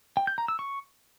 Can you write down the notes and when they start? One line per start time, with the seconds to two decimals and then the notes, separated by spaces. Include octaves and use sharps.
0.17 G5
0.27 G6
0.38 A#5
0.48 E6
0.59 C#6